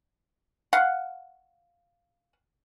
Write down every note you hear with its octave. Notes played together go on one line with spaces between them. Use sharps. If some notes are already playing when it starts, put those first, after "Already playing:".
F5 F#5